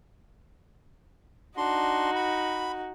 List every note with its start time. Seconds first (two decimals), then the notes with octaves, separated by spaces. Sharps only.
1.57 D4 D#4 F#4 C6
2.15 B5